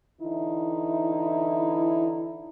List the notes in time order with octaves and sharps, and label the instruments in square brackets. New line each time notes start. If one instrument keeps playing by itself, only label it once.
[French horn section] D3 E3 D#4 E4